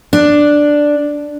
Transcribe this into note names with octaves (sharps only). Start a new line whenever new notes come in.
D4